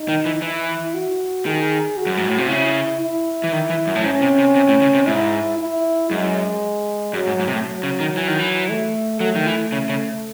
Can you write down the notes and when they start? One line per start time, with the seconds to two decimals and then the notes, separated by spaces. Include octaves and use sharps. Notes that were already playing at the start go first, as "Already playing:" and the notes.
Already playing: D#4
0.09 D#3
0.26 E3
0.42 E3 E4
0.94 F#4
1.46 D#3 G#4
1.97 F#4
2.06 F#2
2.17 G#2
2.28 A2
2.38 C3
2.48 C#3 E4
3.01 E4
3.44 E3
3.53 D#3
3.70 E3
3.87 F#2
3.95 A2
4.04 G#2 C#4
4.22 C3
4.38 C3
4.56 C3
4.68 A2
4.81 C#3
4.94 C3
5.07 G#2 E4
5.58 E4
6.10 F#2 G#3
7.13 F#2 F#3
7.27 G#2
7.39 G#2
7.47 C3
7.53 A2
7.65 F#3
7.83 C#3
8.00 D#3
8.17 E3
8.28 D#3
8.39 E3
8.70 A3
9.20 F#3 A3
9.35 D#3
9.46 E3
9.72 C#3
9.89 C#3